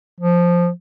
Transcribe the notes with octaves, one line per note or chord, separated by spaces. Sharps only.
F3